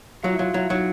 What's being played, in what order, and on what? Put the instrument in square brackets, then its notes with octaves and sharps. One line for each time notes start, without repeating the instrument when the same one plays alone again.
[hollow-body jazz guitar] F#3 [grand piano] F4
[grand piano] E4
[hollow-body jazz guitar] F#3 [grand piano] F4
[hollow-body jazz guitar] F#3 [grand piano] E4
[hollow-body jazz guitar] F#3 [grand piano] D#4